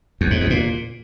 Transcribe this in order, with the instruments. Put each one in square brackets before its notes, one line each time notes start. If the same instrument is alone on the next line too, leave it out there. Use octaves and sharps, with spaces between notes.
[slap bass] E2
G#2
E2
A#2